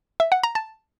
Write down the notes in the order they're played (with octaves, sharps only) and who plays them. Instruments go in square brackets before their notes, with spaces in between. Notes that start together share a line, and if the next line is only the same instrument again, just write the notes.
[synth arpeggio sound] E5
F#5
A#5
A5